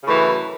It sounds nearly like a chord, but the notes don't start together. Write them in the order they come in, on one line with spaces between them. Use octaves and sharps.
C#3 A2 E3 F#2